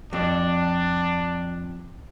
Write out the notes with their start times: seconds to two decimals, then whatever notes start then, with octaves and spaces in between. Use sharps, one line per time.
0.13 F2 D4